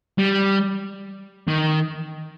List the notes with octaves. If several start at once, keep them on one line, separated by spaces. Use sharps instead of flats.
G3
D#3